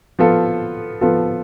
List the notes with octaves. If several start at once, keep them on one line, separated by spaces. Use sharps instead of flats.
F3 B3 F4 A4
F3 B3 F4 A4